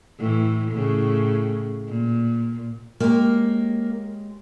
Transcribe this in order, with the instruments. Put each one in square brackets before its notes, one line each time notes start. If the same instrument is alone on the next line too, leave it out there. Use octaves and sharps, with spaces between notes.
[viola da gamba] A2 E3
A2 C#3
A#2
[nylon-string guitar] G#3 G4 C#5 [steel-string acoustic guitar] A#3 A#4